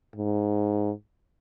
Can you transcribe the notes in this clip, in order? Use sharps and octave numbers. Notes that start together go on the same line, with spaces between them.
G#2